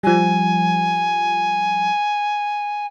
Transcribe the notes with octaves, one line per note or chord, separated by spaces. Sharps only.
F3 G3 G#5